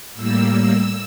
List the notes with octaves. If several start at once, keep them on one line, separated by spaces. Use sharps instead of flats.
A2 G3 A#3 E6